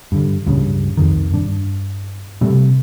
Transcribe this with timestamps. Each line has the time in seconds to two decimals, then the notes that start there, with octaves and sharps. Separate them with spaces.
0.12 G2 D3
0.46 C#2 G2 C#3
0.97 C2 F2 D#3
1.33 G2 D4
2.41 C3 G3 A3